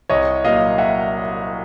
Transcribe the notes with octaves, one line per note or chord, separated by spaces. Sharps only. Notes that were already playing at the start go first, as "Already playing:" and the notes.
C2 C#5 D#5
A#2 F#3 A#3 D#5 F5
E5 F#5